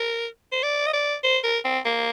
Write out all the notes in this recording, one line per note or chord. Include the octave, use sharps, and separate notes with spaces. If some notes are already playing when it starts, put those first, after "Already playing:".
Already playing: A#4
C5
D5
D#5
D5
C5
A#4
C4
A#3